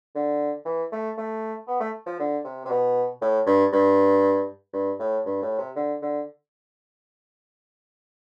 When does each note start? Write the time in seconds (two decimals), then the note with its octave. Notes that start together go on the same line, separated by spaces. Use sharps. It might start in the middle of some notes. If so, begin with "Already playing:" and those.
0.15 D3
0.65 E3
0.92 A3
1.18 A3
1.67 B3
1.80 A3
2.06 F3
2.19 D3
2.45 C3
2.65 C3
2.70 B2
3.22 A2
3.46 G2
3.73 G2
4.73 G2
4.99 A2
5.26 G2
5.42 A2
5.59 C3
5.76 D3
6.02 D3